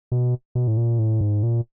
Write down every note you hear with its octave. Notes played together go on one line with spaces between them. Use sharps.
B2
B2
A2
A#2
A2
G#2
A#2